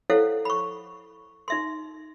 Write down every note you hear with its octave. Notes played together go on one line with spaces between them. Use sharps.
E4 A4 C5 C#5 F5 F#5
B5 C#6
D#4 E5 C6